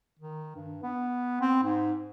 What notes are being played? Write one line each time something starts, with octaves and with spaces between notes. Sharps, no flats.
D#3
G2
B3
C4
G#2